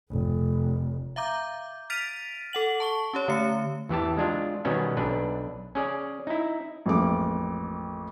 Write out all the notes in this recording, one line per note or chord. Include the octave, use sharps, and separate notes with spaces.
F1
E5 F5 A#5 D6 G6
F6 A6 B6 D7 D#7 F7
A4 F#5 F#7
A5 C#6 G7
C#4 G4 C#5
D3 A3 C#7
E2 E3 G4 A5
G#3 D4 F4
B2 D#3 G3 B3 C#4
B1 D4 B4
C#4 G#4 D5
D#4 E4
A1 F2 G#3 A#3 D6